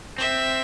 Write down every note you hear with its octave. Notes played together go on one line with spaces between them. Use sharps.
C4 E5